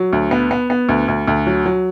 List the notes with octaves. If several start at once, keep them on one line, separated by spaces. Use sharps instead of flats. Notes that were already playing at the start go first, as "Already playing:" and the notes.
Already playing: F#3
D2
B3
B3
B3
D2
D2
D2
F#3
F#3